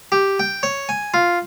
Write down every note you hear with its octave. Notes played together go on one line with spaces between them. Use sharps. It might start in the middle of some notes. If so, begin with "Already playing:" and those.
G4
G5
C#5
G#5
F4